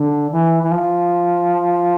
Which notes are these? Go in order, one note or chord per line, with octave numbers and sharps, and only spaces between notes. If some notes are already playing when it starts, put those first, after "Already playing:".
Already playing: D3
E3
E3
F3